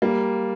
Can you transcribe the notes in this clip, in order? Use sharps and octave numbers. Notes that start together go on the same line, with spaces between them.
G3 A#3